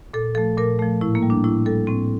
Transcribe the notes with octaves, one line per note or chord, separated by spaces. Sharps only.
A#2 A4
F3 A3 A4
A#2 A#4
F3 A3
A2 E4
A#3
G3
D4
A2 E4
G3 A4
A2 C4